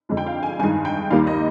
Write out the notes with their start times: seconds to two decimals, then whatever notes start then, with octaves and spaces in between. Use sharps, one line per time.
0.09 F2 D3 G#3 D4
0.17 G5
0.26 F5
0.43 G#5
0.59 G2 D#3 G#3 D#4 G#5
0.85 G5
1.10 D#2 D#3 G3 A#3 D#4 F5
1.27 D#5